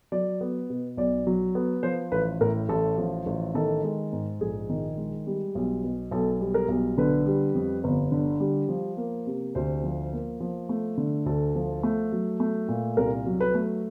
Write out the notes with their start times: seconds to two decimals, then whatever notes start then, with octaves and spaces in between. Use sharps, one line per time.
0.12 F#3 D5
0.41 B3
0.70 B2
0.97 B1 D5
1.27 F#3
1.55 B3
1.83 F3 C5
2.12 A1 B4
2.41 A2 A#4
2.69 A1 A4
2.98 F3
3.26 A1
3.55 D#3 A4
3.84 G#3
4.13 G#2
4.41 A#1 G#4
4.70 D#3
4.97 G#3
5.27 G3
5.55 B1
5.84 B2
6.11 B1 A4
6.41 G3
6.54 A#4
6.69 B1
6.97 D3 B4
7.26 G3
7.54 F2
7.84 G1
8.12 D3
8.40 G3
8.69 F3
8.97 A#3
9.26 C3
9.55 D2 C5
9.83 F3
10.12 A#3
10.40 F3
10.69 A3
10.97 D3
11.26 D2 A4
11.55 F3
11.83 A3
12.12 F#3
12.40 A3
12.68 A#2
12.97 C2 A#4
13.27 F#3
13.40 B4
13.55 A3